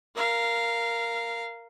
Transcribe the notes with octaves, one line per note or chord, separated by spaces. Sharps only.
A#4 F5